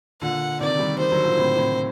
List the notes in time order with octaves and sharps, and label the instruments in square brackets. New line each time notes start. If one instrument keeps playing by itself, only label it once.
[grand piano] A#2 D3 [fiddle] F#5
[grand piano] C3 D#3 [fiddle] D5
[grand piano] D#3 G3
[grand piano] D#3 G3 [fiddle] C5
[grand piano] D3 F#3
A#2 D3
A2 C3
A2 C3